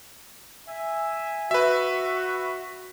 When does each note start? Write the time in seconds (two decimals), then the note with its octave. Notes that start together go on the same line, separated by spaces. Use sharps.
0.68 E5 G#5
1.51 F#4 B4 E5